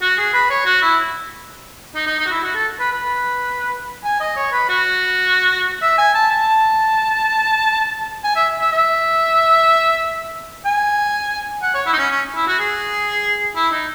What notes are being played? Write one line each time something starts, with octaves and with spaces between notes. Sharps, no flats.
F#4
G#4
B4
C#5
F#4
E4
D#4
D#4
D#4
F#4
E4
F#4
A4
B4
B4
G#5
D#5
C#5
B4
F#4
E5
G#5
A5
A5
G#5
E5
E5
E5
G#5
F#5
C#5
E4
D#4
C#4
C#4
E4
F#4
G#4
E4
D#4